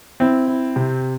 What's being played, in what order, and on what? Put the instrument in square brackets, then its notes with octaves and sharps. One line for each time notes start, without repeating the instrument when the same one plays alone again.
[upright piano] C4 [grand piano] E4
[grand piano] E4
C3